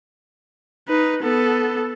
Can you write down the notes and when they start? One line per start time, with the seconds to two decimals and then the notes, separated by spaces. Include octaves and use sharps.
0.88 D#4 B4
1.23 B3 A4